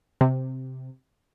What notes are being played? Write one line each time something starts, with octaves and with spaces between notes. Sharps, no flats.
C3